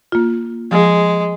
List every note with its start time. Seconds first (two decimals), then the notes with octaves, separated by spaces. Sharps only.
0.12 A#3 F4
0.71 F3 G#3